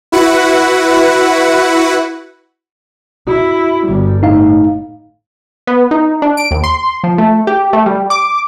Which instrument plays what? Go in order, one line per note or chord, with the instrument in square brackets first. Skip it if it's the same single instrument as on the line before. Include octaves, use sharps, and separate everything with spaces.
[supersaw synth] E4 F#4 B4 F#5
[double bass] E4 [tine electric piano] F#4
[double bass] G1 G3
[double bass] A2 [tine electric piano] D#4 F5
[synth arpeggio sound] B3
D#4
D4
D7
D#2
C6
F3
A3
G4
A3
G3
D6